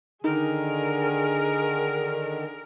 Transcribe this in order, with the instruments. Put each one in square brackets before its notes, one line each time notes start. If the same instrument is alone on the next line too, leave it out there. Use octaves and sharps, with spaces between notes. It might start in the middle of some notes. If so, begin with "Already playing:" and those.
[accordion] D3 D#3 [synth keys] D#4 [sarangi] G#4 [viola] A#4